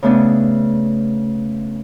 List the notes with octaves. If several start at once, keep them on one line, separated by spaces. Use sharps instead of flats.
C#3 A3 B3 D4